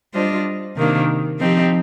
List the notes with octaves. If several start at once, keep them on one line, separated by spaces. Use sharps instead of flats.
G3 D4 F4 C5 D#5
C3 D#3 A#3 D4
F3 C4 D#4 G4